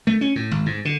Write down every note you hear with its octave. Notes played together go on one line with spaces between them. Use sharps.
A3
C#4
A2
G#1
G#2
D3